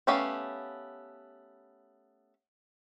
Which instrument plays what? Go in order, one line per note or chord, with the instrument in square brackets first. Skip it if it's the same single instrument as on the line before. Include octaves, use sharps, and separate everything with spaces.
[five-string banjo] A3 B3 C#4 G4 F5